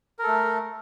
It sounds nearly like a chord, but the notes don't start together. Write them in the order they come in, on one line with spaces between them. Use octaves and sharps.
A#4 A4 A3